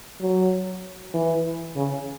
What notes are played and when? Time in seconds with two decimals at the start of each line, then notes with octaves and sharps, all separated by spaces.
0.21 F#3
1.14 E3
1.76 C#3